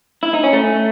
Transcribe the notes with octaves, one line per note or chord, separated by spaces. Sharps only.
E4
D#4
C#4
A3